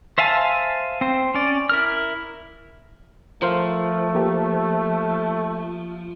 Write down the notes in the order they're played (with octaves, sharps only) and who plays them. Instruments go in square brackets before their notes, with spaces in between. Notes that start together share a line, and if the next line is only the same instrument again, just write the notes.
[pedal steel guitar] C5 E5 F5 G#5 A5
C4 C5
C#4 D5
E4 A#4 F6
[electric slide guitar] F3 [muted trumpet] A3 [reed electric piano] A#4 C5 F5
[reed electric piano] A#3 G4